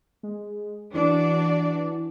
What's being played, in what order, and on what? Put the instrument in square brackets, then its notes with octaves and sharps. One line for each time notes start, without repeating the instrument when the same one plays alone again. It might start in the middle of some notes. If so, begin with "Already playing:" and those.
[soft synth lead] G#3
[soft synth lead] E3 [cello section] D4 F#4 D5